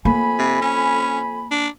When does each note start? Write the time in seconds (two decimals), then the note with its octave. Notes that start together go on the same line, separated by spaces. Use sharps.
0.05 F2 A#3 G#5 B5
0.39 C3
0.61 C#4
1.51 D4